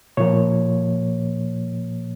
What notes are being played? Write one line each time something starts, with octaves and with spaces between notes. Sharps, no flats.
A#2 F3 A#3 C#5